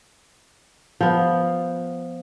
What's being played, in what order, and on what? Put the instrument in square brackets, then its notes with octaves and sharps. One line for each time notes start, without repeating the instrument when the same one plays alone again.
[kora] F3 B3